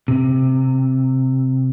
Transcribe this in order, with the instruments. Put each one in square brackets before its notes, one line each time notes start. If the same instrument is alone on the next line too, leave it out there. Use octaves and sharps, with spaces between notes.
[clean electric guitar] C3